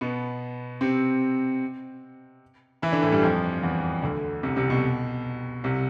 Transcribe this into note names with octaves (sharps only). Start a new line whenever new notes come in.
B2 B3
C3 C4
E3 E4
D3 D4
A2 A3
G2 G3
F2 F3
E2 E3
D2 D3
C2 C3
C2 C3
B2
C2 C3